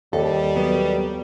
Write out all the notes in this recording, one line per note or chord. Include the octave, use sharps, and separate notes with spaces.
D#2 G3 A4
F#3 B3